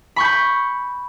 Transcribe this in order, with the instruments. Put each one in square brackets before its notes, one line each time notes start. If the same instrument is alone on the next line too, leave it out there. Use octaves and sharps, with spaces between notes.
[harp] B5 C#6 G6